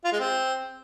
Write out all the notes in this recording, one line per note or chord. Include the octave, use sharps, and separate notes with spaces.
F4
G#3
C4